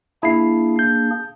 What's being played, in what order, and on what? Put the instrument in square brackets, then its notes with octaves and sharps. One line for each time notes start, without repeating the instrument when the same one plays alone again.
[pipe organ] A#3 D4 G#4 [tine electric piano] E4 C7
[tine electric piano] G6